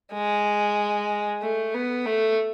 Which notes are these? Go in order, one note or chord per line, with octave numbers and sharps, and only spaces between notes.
G#3
A3
B3
A3